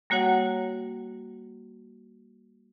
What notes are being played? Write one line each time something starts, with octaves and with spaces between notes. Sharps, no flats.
G3 A#3 F#4 C#5 F#5